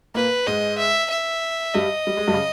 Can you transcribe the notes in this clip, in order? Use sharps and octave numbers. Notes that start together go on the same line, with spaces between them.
A#2 A#3 B4
G#2 G#3 D#5
E5
E5
G2 G3 D#5
G3
G#3
G2 G3
C#3